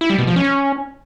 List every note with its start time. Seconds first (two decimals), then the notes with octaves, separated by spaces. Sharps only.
0.01 E4
0.10 G3
0.19 B2
0.27 F3
0.36 C#4